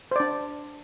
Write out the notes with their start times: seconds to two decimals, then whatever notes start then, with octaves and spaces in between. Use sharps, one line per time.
0.11 C5
0.16 D5
0.20 D4